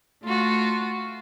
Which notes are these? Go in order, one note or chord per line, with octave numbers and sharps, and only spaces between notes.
A3 F4 F#4